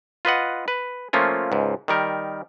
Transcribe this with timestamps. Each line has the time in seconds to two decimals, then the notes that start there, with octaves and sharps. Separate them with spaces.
0.25 F4 B4 D#5 F#5
0.68 B4
1.13 F3 A3 A#3 C#4 F4
1.52 C#2 G#2
1.88 D#3 G3 A#4